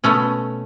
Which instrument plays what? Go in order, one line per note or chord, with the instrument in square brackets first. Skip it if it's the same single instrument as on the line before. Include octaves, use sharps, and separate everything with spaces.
[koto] B2 A3 C#4